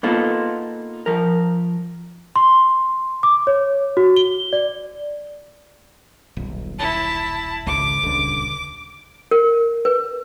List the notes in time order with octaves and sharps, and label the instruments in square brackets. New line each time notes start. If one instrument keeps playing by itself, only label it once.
[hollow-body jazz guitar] A#3 B3 D#4 F4 A4 C5
F3 A#4
[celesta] C6
D6
C#5
F#4
G7
D5
[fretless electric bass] D#1 B1
[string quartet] E4 A5
[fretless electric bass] G#1 C#2 [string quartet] D6
[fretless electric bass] D#1 C#2 D3
[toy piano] A#4
B4